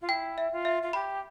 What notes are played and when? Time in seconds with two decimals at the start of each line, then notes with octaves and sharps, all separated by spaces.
0.01 F4
0.09 E4 G5
0.38 E5
0.52 F4
0.65 E5
0.82 F4
0.93 G4 B5